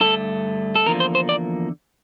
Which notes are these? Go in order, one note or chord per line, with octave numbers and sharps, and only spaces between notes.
G2 D3 A3 A4
A4
E2 D3 F3 A#3 A#4
C5
C5
D5